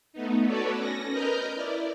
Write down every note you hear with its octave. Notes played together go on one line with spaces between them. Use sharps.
A3 B3 D#4
F#4 A4 B4 C#5 D5
C#4 A#6
A#4 B4 D#5 F6 G6
E4 D5